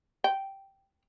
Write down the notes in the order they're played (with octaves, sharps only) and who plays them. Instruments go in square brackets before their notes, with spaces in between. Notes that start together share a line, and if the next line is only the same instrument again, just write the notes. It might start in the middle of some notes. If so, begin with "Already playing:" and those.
[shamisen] G5